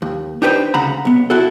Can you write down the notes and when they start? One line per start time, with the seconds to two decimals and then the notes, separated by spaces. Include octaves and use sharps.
0.02 D#2
0.42 D4 D#4 G4 G#4 B4 C5
0.74 D2 C#3 F#5 A#5 B5
1.05 B1 B3
1.30 E4 F#4 A4